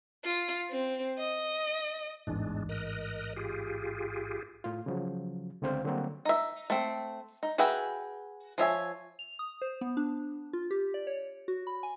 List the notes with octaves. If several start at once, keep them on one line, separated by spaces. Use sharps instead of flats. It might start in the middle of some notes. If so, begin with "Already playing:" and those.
F4
C4
D#5
A1 E2 G#2 G#3 D4
A#4 D#5 F#6
F4 G4 G#4
A2 F4
C#3 F3 F#3
C#2 D3 C4 C5 F5
D3 F#3 G3 A#3 C4 F#4
D#4 E5
A3 C4
D#4
F#4 G#4 B4 E5 G5
F3 C#5 E5 G#5
F7
D#6
C5
B3
D4
F4
G4
D5
C#5
F#4
B5
G#5